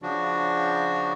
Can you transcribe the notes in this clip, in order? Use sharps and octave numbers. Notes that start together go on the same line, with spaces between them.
C#3 F3 D4 F#4